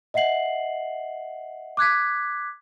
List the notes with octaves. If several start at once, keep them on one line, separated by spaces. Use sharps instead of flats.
D#5 E5 F#5 C7 F#7
D6 F#6 G#6 B6